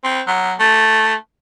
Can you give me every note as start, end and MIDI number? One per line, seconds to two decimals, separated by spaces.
0.04 0.21 60
0.27 0.53 54
0.59 1.13 57